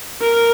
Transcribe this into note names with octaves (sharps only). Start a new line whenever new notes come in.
A#4